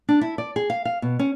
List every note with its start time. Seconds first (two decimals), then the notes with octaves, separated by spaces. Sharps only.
0.09 D4
0.21 E4
0.38 D5
0.56 G#4
0.70 F5
0.85 F5
1.02 B2
1.19 C#4